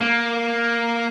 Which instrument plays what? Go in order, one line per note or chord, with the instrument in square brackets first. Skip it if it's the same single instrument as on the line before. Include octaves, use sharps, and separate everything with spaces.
[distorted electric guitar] A#3